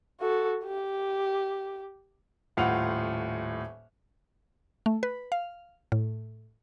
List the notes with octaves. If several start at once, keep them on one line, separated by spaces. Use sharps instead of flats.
F#4 A4
G4
D#1 A2 F4 F#5 F7
A3
B4
F5
A2